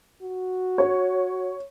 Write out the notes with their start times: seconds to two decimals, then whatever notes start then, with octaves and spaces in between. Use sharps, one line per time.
0.22 F#4
0.78 C#5